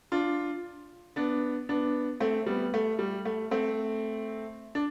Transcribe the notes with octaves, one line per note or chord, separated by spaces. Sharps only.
D4 F4
B3 D4
B3 D4
A3 C4
G3 B3
A3
G3
A3
A3 C4
D4